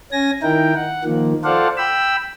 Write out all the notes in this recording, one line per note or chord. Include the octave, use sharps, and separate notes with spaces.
C#4 G#5 A#6
D#3 D#4 E4 A#4 G5
F#5
D#3 F3 A#3
F4 A4 C5 D5 F5 F#5
G5 B5 E6